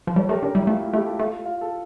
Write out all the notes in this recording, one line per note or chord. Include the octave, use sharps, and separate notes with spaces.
F3
G3 A4 C#5
A3 G4 A#4
D3 G4 A#4
G3 E4
A3 F4
E4
A3 E4 G4
F4 A4
A3 F4
F4
A4